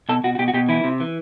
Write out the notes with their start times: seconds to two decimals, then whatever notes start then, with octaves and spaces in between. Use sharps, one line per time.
0.09 B2 A4
0.24 B2 F#4
0.35 F#4
0.39 B2 G4
0.48 F#4
0.54 B2 G4
0.69 E3 E4
0.84 C3
1.00 E3